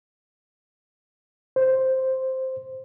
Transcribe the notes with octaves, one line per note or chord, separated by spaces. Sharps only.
C5